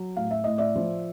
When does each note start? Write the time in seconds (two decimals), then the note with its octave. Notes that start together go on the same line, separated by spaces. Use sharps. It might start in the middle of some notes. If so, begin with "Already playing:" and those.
Already playing: F#3
0.16 A2 F5
0.31 E5
0.44 A2 D#5
0.58 D5 E5
0.76 F3